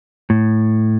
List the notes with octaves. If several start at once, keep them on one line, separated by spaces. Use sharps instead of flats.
A2